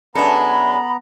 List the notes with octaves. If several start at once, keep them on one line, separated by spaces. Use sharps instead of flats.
F#2 G#3 B3 D4 A4 E5 A#5 B5